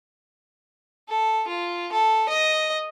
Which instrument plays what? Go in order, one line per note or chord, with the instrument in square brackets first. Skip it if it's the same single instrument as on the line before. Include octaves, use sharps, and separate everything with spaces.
[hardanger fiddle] A4
F4
A4
D#5